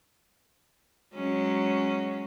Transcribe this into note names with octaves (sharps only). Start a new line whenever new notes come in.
F#3 G#3 C#4